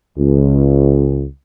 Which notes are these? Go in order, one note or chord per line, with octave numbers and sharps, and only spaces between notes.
C#2